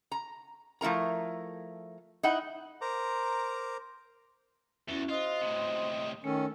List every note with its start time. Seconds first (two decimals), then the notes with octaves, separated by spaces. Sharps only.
0.12 A#5
0.81 F3 A3 E4 A#4 A#5
2.23 D#4 E4 F#5
2.81 A#4 C5 A#5 D6
4.88 E2 C#4 E4 F#4
5.09 F4 F#4 C5 D#5 C6
5.42 A2 C3
6.24 D#3 A3 C#4 A4